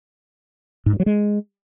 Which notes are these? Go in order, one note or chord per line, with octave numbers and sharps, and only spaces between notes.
G#2
G2
F#3
G#3